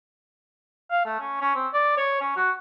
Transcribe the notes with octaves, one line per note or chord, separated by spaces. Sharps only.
F5
A3
C#4
C#4
C4
D5
C#5
C#4
F#4